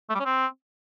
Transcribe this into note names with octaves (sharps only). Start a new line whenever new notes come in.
A3
G3
C#4
C4